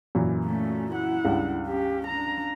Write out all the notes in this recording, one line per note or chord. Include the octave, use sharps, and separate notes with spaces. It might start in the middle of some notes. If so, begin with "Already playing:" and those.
F#2 A#2 E3
A3 C#4
E4 F#5
C#2 G2
C#4 G4
D4 A#5